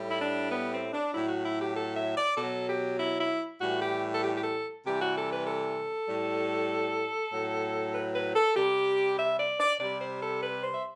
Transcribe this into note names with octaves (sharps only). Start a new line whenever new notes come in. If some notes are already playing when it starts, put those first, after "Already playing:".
Already playing: A2 G3
E4
D4
B3
C4
D4
A2 F#3 E4
F#4
E4
G4
A4
E5
D5
B2 F#3 A4
G4
E4
E4
A2 E3 G3 F#4
G4
A4
G4
G4
A4
C3 E3 G3 G4
F#4
A4
B4
A4
A2 G3
A2 F#3
B4
B4
A4
C3 G3 G4
E5
D5
D5
C3 G3 D5
C5
A4
B4
C5
E5